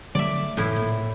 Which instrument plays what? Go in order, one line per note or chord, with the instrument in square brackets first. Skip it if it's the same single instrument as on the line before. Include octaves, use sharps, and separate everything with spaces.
[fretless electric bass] D3 F#3 A3 [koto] D5 E5
[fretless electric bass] F#1 E3 [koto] A2 E4
[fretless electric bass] A#2